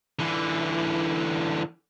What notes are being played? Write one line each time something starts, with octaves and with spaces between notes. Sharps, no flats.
D3 E3